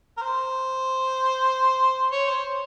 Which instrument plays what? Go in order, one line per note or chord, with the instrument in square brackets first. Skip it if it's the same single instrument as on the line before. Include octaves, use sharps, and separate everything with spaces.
[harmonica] A#4
C5
C#5
C5